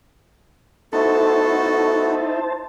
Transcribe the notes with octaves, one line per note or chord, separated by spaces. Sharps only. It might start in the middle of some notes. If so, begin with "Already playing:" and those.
A3 B3 D#4 E4 F#4 A4 C5 A5